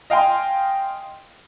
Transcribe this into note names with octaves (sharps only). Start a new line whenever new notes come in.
D#5 F5 G5 G#5 C6